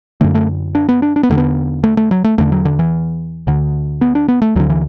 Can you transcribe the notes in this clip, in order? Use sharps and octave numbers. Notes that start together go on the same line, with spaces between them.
F#2 D3 A3
A3
D4
B3
D4
D4
B3
E2 D3 A3
B3
A3
A3
F#3
A3
E2 D3 A3
F#3
D3
E3
D2 D3
B3
D4
B3
A3
D2 D3 F#3
E3